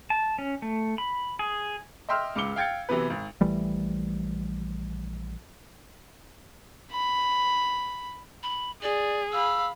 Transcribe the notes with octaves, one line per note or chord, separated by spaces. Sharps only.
A5
C#4
A3
B5
G#4
D#5 E5 G5 C6 E6 F6
C#2 G#2 F5 D6 C#7 G7
F5 G5 G#6 A6 C#7
C3 E3 F#3 B3 B4
G#1
A#1 E3 G3 A3
B5
B5
G#4 D5
F5 B5 E6